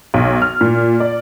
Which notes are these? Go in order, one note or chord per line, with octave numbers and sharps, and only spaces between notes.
B1
F6
A#2
D5